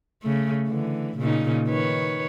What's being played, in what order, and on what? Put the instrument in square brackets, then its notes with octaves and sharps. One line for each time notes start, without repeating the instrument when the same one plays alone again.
[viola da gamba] C#3 A3
D3 E3
A#2 C#3 D#4
D#3 B4 C#5